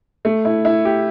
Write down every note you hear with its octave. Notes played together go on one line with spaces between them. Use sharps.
A3
E4
E4
G4